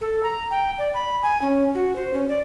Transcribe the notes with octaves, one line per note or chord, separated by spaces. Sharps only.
A4
A#5
G5
D5
B5
G#5
C#4
F#4
C5
C#4
D5